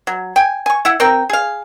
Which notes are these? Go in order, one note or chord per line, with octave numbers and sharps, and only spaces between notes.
F#3
G5 G#5
G#5 C#6
E4 E5 F#5
C4 A#4 G5
G#4 F5